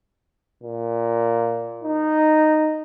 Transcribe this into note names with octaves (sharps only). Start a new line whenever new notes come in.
A#2
D#4